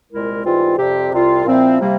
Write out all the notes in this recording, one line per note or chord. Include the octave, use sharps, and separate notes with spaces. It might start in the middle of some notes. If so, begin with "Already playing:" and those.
C2 A#2 G#3 E4 A#4
G#2 E3 G3 C4 F4
F2 C3 G3 C4 G4
C2 C3 G3 C4 F4
A#2 F3 C4 E4
C3 G3 A#3